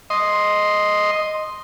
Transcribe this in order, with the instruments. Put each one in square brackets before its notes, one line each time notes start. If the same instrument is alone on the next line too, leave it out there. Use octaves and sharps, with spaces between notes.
[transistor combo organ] D#5 C6